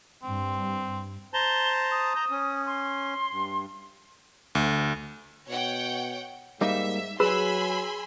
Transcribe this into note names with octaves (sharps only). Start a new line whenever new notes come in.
G2 C4
C5 A5 A#5 G7
D#6
A#5 G6
C#4
C6
G2
D2
B2 C#5 F#5 G5
G#2 G3 A#3 D#4 E5
F#3 G#4 B4 G#5 B5 C6 E6 E7